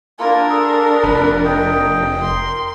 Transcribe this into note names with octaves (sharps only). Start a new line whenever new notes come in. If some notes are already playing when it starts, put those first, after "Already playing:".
A#3 D4 E4 F4 A#4
G#4 A4
F1 B4 B5
D#5 G5
A#4 C6